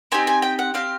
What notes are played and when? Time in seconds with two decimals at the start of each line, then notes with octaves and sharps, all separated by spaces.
0.12 C4 D#4 G4 G#5
0.27 G#5
0.42 G5
0.59 F#5
0.74 C4 D#4 G4 F5